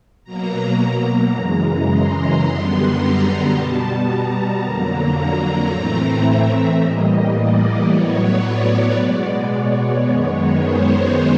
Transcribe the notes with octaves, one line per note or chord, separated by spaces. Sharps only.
B2 F#3 A#3 A#5
F#2 C#3 E3 G#3
C6
F#2 D3 G3 B3
A#5
B2 G3 B3 A5
A#5
F2 D3 F#3 A#3
A#5
A2 E3 A3 C4
E5
A2 E3 G3 A#3 D#5
D5
A2 F#3 B3 C#5
D5
B2 G#3 B3
C#5
F#2 D#3 G#3 B3
C5